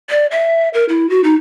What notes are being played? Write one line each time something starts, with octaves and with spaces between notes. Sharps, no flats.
D5
E5
A#4
E4
F#4
D#4